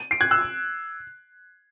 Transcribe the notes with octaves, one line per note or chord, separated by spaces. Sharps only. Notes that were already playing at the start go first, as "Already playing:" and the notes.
Already playing: D#7
C7 D7
F#6 G#6
E6 F#6